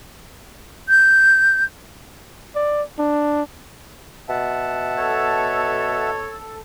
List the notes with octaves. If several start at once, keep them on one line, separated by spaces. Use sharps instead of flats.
G6
D5
D4
B2 E5 F#5 A5
A4 C#5